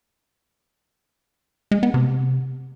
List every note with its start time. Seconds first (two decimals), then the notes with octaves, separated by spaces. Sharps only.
1.71 G#3
1.83 B3
1.94 C3